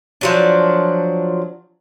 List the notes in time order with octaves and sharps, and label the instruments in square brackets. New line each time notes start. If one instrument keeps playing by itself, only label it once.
[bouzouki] F3 F#3 D4